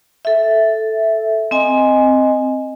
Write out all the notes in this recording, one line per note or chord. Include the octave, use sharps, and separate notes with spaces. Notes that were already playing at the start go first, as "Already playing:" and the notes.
A4 E5
C4 D#5 G#5